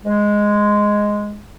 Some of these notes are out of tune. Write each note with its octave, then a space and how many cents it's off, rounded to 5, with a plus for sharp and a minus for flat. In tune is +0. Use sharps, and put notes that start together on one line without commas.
G#3 +0